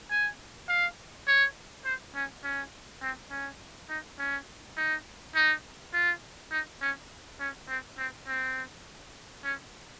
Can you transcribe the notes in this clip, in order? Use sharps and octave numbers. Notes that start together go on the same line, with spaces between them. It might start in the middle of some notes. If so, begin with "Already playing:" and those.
G#5
F5
C#5
C5
C#4
C#4
C4
C#4
D#4
C#4
D#4
D#4
F4
D#4
C#4
C#4
C4
C4
C4
C#4